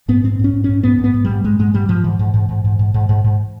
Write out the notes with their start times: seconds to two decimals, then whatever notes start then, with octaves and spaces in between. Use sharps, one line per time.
0.08 G#2 B3
0.24 G#2 C4
0.39 G#2 C#4
0.53 G#2
0.64 G#2 C#4
0.83 G#2 B3
0.99 G#2
1.04 B3
1.14 G#2
1.25 G#2 G3
1.44 G#2 G#3
1.59 G#2 G#3
1.74 G#2 G3
1.88 G#2 F3
2.04 G#2 E3
2.19 G#2
2.34 G#2
2.49 G#2
2.64 G#2
2.79 G#2
2.94 G#2
3.09 G#2
3.24 G#2